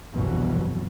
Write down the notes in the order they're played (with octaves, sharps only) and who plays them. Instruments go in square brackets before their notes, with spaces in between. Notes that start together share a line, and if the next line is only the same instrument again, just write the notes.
[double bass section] G1 C2 F2 B2 E3 F#3